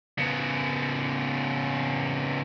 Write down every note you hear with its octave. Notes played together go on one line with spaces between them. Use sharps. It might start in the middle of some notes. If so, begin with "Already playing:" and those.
C#3 B3